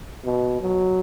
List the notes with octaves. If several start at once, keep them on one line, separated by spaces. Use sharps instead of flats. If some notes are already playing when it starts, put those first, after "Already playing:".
B2
F#3